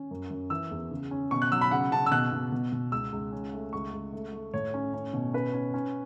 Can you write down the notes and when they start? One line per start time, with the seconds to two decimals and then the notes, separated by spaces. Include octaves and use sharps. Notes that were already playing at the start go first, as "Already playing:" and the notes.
Already playing: C#4
0.11 F#2
0.30 F#2
0.50 E3 E6
0.71 E2
0.91 C#3
1.11 C#4
1.31 B2 C#6
1.42 F#6
1.52 F#3 E6
1.61 B5
1.71 C#3 F#5
1.92 C#3 A5
2.06 E6
2.12 B2 F#6
2.32 B2
2.52 B2
2.72 B2
2.92 C#2 E6
3.12 C#2
3.32 C#4
3.53 A3
3.73 C#2 C#6
3.93 C#2
4.13 A3
4.33 A3
4.54 A2 C#5
4.74 C#4
4.94 C#4
5.14 B2
5.33 C#4 B4
5.53 C#4
5.74 C#4